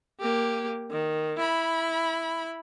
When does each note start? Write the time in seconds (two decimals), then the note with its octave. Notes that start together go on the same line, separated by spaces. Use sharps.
0.20 A#3 G4
0.91 D#3
1.37 E4 B5